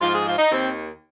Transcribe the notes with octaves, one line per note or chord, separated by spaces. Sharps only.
G#2 F3 F4
G#4
F4
D#4
D#2 D#3 C4